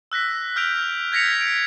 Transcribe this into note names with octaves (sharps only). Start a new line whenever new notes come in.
E6 F#6 A#6 B6
E6 F6 G6 B6 D7 F7
G6 G#6 A#6 B6 C#7 F7
D7